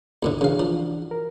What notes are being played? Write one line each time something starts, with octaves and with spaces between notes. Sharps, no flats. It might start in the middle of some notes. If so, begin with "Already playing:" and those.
D#2 A2 D3
C#3 E3 D4 F#4 F5
F3
A#4